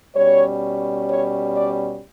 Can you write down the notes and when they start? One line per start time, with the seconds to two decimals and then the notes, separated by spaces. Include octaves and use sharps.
0.15 B2 G3 C#4 C#5
1.09 C#5
1.55 D5